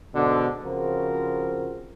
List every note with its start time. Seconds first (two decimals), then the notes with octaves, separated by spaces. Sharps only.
0.15 G#2 B2 D3
0.65 C#3 F3 C4 F4 F#4 A#4